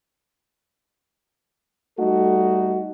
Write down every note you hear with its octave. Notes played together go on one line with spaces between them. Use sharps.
G3 A3 D#4 F#4 A4